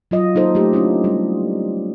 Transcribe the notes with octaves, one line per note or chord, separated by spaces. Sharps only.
F#3 F4 D#5
A#3 D#4 A4 C5
A3 G4
C#4 D4 E4 F4
G3